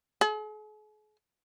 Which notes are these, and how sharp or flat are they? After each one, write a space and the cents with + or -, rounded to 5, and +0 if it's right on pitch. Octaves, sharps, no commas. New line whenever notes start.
G#4 +45